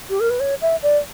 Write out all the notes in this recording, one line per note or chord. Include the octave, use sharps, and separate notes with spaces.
G4
A#4
B4
C#5
E5
D5